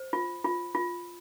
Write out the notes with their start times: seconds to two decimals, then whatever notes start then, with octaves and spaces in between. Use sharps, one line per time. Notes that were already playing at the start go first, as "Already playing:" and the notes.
Already playing: C5
0.13 F4
0.44 F4
0.75 F4